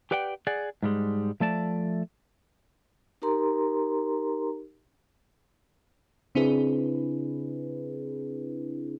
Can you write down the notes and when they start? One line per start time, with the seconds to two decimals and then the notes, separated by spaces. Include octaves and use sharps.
0.11 G4 B4 D5 F#5 G5
0.47 G#4 D5 F#5
0.83 G#2 G3 G#3
1.40 F3 A3 D5 A5
3.22 D#4 G4 A#4 A#5 C6
6.35 C#3 C4 D4 E4 G#4 B4